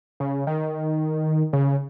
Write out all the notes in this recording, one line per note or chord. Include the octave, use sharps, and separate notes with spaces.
C#3
D#3
C#3